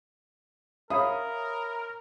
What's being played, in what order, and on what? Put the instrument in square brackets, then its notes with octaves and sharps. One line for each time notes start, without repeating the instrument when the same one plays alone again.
[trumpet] A#4 [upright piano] C#5 B5 D#6 [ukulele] E5 F5